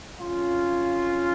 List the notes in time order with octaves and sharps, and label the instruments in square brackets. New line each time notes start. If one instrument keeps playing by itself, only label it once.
[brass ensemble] F2 C#3 F#3 C#4 F4